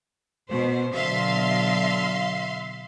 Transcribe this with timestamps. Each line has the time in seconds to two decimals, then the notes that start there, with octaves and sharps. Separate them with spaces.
0.49 B2 C5
0.94 B2 D3 F#3 E5 F5 C6